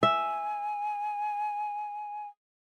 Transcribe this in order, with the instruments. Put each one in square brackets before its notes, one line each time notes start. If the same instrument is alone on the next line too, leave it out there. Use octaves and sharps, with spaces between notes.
[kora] E5 [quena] G#5